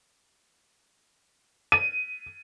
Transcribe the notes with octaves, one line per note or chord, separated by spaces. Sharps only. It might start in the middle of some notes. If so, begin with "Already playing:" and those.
D#7